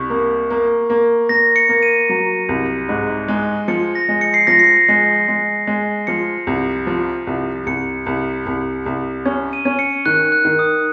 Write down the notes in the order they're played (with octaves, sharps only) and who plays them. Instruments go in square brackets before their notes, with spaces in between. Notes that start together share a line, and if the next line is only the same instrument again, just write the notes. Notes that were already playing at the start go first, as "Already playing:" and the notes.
Already playing: [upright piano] C2 [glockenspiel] C#6
[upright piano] A#3
A#3
A#3
[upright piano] A#3 [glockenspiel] A#6
[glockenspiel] C#7
[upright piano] A#3
[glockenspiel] D#7
[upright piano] F#3
C2
G#2
G#3
[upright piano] F3 [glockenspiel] C#7
[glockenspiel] A#6
[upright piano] G#3
[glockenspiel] C#7
C7
[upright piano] F3 [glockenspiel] A#6
[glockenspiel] C7
[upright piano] G#3
G#3
G#3
[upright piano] F3 [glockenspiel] C#7
[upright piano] C2
F3
C2
[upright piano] C2 [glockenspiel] C#7
[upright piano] C2
C2
C2
C#4
[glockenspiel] D#7
[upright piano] C#4
[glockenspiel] C#7
[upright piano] D#3 [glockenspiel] F#6
[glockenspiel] F#6
[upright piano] D#3
[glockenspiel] D#6